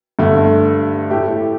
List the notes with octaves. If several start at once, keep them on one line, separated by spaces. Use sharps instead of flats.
G2 D3 A3
A2 A3 G4